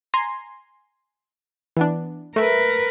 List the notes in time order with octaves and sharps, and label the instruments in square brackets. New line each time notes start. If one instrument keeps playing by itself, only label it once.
[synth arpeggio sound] G#5 A#5 C6
E3 B3 D4
[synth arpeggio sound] A3 E5 [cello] A#4 B4